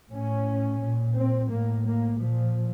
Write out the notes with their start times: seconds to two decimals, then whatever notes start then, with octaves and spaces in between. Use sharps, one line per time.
0.12 A2 C#4
0.82 A#2
1.16 C4
1.50 A2 A#3
1.86 A#3
2.20 A#2 F3